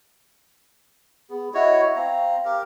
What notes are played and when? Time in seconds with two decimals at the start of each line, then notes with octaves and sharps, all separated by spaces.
1.30 B3 G#4
1.54 E4 F#4 C#5 D#5
1.96 C4 F5 A#5
2.45 G4 A#4